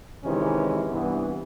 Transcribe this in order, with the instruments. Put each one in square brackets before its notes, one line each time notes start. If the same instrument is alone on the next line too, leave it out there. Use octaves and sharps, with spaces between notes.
[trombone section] C3 D#3 E3 G#3 C#4 E4
G2 C3 E3 B3